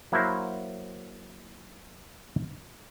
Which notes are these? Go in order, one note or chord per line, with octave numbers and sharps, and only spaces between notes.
F#3 A#3 E4 F#4 A#4 C5